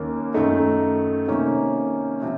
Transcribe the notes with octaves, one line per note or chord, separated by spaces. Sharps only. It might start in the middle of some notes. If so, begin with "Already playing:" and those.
Already playing: D#2 D#3 A#3 C#4
F#2 D#3 A3 D#4
C3 D#3 A#3 C#4
C3 F3